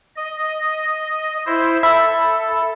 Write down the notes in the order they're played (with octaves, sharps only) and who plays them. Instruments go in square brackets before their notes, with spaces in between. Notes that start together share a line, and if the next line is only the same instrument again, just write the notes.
[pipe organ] D#5
E4 C5
[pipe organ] A4 [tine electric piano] E5 [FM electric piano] B5